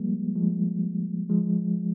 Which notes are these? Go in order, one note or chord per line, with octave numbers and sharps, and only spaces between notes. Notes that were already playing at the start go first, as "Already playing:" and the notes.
Already playing: F3 G3 G#3 A#3
F3 G#3
F3 G#3